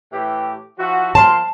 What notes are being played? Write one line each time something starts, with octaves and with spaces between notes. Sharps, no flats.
A2 E3 G4
F3 E4 F#4
F3 A#4 A5 C6